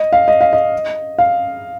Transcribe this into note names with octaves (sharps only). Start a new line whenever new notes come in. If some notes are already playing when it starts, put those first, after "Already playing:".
Already playing: D#5
F5
D#5
F5
D#5
F5